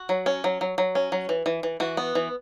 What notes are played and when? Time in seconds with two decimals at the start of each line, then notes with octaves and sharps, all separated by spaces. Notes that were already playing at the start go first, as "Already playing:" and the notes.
Already playing: F#4
0.09 F#3
0.26 C#4
0.44 F#3
0.61 F#3
0.78 F#3
0.95 C#4
1.12 F#3
1.29 E3
1.46 E3
1.63 E3
1.80 E3 F#4
1.97 B3
2.15 E3